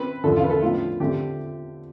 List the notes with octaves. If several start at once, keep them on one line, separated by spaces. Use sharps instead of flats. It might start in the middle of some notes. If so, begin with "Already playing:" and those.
Already playing: C4 B4
E2 D3 F3 A4
F4
B4
A4
A2 F3 B3 D4 F4
D3 A3 C4 G4